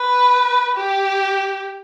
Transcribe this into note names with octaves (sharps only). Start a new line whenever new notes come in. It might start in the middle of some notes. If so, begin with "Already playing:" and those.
Already playing: B4
G4